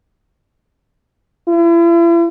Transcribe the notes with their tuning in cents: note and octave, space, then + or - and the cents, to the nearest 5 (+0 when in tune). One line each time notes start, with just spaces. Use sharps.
E4 +40